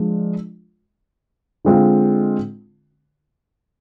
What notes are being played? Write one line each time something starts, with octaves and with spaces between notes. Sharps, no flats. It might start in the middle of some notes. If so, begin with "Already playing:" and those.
Already playing: F3 G#3 D4 F4
D3 G#3 C4 F4